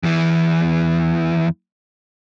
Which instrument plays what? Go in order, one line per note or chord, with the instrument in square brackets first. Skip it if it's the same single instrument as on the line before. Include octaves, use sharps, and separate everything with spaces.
[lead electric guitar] E2 E3